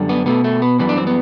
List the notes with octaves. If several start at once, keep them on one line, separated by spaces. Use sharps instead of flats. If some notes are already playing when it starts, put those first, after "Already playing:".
Already playing: F#2 D3 G3
B3
B2 A3 B3
A3
B3
F#2 E3 G3 B3
D4
C4
B3